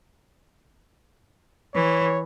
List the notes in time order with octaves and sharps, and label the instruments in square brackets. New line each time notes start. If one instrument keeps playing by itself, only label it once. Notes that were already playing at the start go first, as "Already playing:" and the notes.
[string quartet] E3 [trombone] C#5